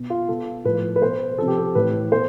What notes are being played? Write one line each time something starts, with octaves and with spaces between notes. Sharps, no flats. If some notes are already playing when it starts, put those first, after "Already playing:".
Already playing: B2
F4
B2 A4
A2 F3 B4
B4
B2 C5
C3 F3 A4
G4
A4
A2 E3 B4
B2 C5